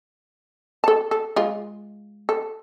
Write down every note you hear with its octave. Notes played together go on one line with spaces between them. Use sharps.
A4 A5
A4
G#3 F4
A4